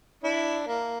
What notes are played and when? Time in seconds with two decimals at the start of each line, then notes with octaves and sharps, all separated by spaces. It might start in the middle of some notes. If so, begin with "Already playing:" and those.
0.23 D4 E4
0.67 A#3